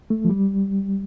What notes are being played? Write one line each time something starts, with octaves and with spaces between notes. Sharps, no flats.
A3
F3
G3